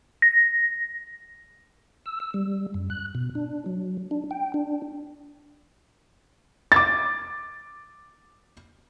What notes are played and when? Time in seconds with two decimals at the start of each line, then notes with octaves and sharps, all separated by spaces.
0.22 A#6
2.06 E6
2.20 E6
2.34 G3
2.74 F#2
2.90 F#6
3.15 B2
3.35 D4
3.66 F#3
4.11 D4
4.31 G5
4.54 D4
6.72 D6 A6